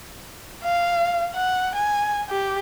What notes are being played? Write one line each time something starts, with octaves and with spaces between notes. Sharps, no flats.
F5
F#5
G#5
G4